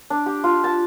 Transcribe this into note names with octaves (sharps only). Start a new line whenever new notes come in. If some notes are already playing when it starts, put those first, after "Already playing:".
D4
G4
F4
A5